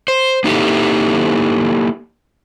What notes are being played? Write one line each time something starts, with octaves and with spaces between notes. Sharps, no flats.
C5
A#3 D#4 E4 F#4 G4 A4